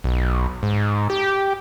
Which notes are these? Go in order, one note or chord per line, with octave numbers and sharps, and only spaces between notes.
B1
G#2
G4